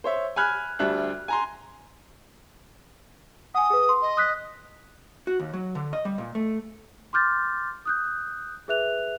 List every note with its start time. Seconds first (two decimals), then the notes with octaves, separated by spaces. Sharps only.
0.04 C5 C#5 E5
0.36 G#5 B5 F6 F#6 G#6
0.79 D2 G3 D4 E5 F#6
1.28 G#5 A#5 C6
3.55 F#5 G#5 D#6
3.70 G#4 B4
3.89 C6
4.02 D#5
4.17 D#6 F#6 B6
5.27 F#4
5.40 D#2
5.54 F#3
5.75 D3
5.93 D#5
6.05 G3
6.18 A#2
6.35 A3
7.13 C6 D6 F6 G6 A6
7.85 D#6 F#6 G6
8.68 G#4 B4 E5 F#6 F7